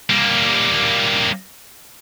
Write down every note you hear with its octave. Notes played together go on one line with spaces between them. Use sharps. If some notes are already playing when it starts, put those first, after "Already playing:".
G3 A#3